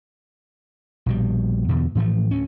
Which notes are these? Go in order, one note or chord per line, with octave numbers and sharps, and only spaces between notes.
A#1 B2 G3
E2 B2 D3
A2 E3 F3 A3
D2 C#4